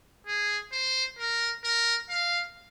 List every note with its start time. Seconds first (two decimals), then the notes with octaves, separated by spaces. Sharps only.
0.27 G#4
0.72 C5
1.18 A#4
1.64 A#4
2.10 F5